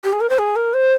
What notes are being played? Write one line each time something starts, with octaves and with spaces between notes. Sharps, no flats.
G4
G#4
A#4
C5
G#4
A#4
C5